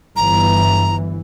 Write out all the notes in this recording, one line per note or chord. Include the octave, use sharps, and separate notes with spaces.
G1 E3 A#5